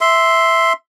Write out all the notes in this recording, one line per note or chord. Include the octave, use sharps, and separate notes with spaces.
E5 C6